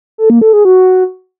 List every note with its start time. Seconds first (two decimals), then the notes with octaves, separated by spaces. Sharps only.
0.18 A4
0.30 A#3
0.42 A4
0.53 G#4
0.65 F#4